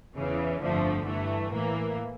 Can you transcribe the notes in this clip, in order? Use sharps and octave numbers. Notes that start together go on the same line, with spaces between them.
E2 C#3 E3
G1 F2 D3 F3 A3
G2 E3 A3
A2 E3 A#3